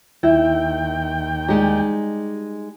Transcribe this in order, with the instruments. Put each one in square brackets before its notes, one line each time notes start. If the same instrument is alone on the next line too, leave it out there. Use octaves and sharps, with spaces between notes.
[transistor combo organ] D#2 G5 [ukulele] E4
[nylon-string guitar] G3 G#3 D#4 [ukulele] G4